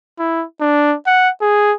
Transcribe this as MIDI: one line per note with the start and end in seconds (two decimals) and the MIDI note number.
0.19 0.45 64
0.61 0.95 62
1.06 1.30 78
1.41 1.74 68